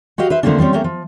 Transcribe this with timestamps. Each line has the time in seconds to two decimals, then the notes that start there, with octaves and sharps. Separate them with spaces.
0.18 F#4 G4 B4 D#5 F5
0.30 B4 C5 E5
0.43 D3 F3 A3 A#3 C4 D4
0.58 F3 G3 C4 C#4
0.73 A3 A#3 C#4 G5
0.84 F3